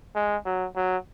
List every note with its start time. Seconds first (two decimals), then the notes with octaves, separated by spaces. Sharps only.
0.16 G#3
0.45 F#3
0.76 F#3